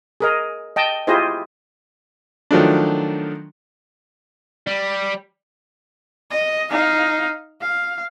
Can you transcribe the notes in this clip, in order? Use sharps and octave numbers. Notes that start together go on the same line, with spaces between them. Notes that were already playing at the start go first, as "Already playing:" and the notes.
G#4 A#4 D#5
D#5 G5 A5
E4 F4 G4 G#4 C5 D#5
D#3 F3 F#3 A3 D4
G3
D#5
D#4 F5
F5